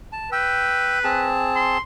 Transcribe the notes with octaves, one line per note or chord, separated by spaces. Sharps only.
A5
B4 G5 E6
C4 G#4 A5
C6